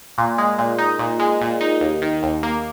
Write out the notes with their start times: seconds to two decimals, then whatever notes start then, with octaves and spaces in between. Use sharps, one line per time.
0.18 A#2
0.38 G#3
0.58 A#2
0.78 D#4
0.99 A#2
1.20 G#3
1.41 A#2
1.61 D#4
1.81 D#2
2.02 D#3
2.23 D#2
2.43 A#3